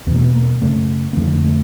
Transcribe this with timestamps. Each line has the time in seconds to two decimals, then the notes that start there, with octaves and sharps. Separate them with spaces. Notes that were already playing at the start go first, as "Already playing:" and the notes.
0.07 E2 B3
0.11 B2 A#3
0.22 B3
0.34 A#3
0.62 F#2 C#3 A3
1.13 A#3
1.17 F2 D3 A3
1.44 A3